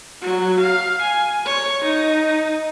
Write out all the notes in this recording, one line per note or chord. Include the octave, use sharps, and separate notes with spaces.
F#3
F5
G#5
C#5
D#4